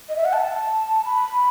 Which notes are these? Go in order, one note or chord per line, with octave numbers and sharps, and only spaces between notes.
D#5
E5
F#5
A5
B5